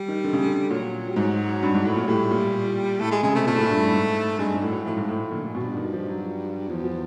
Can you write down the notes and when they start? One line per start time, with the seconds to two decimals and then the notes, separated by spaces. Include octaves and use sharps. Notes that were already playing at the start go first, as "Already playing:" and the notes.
Already playing: G3
0.08 D#3
0.24 D3
0.33 C#3
0.44 D3
0.70 A#2 F#3
1.10 G3
1.16 G#2 F#3
1.63 G2
1.74 G#2
1.85 A2
1.96 A#2
2.08 A2 G3
2.31 A#2
3.00 A2 A3
3.12 G#3
3.23 C#3 G#3
3.35 C3 A3
3.47 A#2 A3
3.55 A2
3.61 A#2
3.70 G2
3.85 A2
3.93 G#2
4.39 G2 G#3
4.54 G#2
4.62 A2
4.69 F#3
4.85 A2 F3
4.96 G#2
5.08 A2
5.31 A#2 D3
5.46 G#2
5.55 B2
5.61 G2
5.77 D#3
5.93 F3
6.08 F#3
6.69 E2 F3
6.84 F3